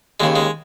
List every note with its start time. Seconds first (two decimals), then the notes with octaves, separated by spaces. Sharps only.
0.20 D#2 C#3 G#3
0.36 G#3